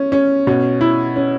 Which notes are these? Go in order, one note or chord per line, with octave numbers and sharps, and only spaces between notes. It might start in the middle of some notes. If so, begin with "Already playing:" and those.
Already playing: C#4
C#4
B2 C#4
E4
C#4